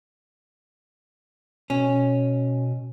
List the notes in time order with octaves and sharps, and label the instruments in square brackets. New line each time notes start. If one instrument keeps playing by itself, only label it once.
[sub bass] B2 [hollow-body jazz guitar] C#4